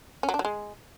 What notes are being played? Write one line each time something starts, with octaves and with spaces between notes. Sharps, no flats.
C#4
F#3
D4
F#3
G#3